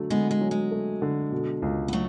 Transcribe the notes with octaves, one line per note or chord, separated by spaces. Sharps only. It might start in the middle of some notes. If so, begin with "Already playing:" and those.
Already playing: D3 F#3 A3
D3 G#3 B3
G#3
F#3
G#3
A3
D3
B2
C#2
B3
F#3 A3